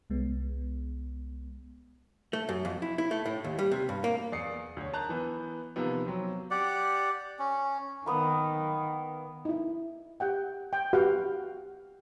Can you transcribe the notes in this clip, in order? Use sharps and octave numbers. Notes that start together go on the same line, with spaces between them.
C2 G#3 B3
A3
F#2
F2
E4
E4
A3
A2
D#2
G3
C3
G2
A#3
E2 D5 D#6 C7 C#7
D2 C#5
A#4 A5 A#5 F#6 G6
E3 B3
C3 D#3 F3 A#3 B3
F#3 C4
G4 D5 F#5
C#4
D#3 A#3 B3 D#6
D#4 E4
G4 F#5 G5
G5
F#4 G4 B4 F5 F#5